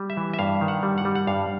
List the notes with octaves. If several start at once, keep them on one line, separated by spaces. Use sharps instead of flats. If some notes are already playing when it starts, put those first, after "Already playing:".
Already playing: G3
E5
E3
E5
G2 F5
D#3
F#5
G3
F#5
G3
F#5
G2 F5